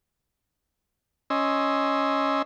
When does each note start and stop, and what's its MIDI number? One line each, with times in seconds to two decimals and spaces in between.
1.30 2.42 61
1.30 2.42 75
1.30 2.42 80
1.30 2.42 84
1.30 2.42 88